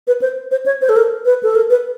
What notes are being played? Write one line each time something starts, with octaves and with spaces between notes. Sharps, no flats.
B4
C5
C5
C#5
C5
A4
A#4
B4
A4
A#4
B4